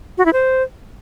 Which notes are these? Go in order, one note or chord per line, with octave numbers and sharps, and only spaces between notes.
F#4
E4
C5